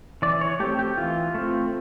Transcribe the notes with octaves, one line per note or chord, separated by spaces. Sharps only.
E3 D5
C#5
A3 C4 G4
G4
E3 F4
A3 C4